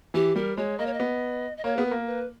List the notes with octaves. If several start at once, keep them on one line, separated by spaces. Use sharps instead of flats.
E3 G4
G3 A#4
G#3 C#5
A#3 D#5
C#5
D#5
B3
D#5
A#3 C#5
B3 G#4
A#4
A#3
B4